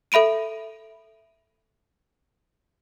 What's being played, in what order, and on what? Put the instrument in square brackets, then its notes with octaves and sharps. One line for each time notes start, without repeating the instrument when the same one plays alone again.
[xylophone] A4 E5 B5 D7 D#7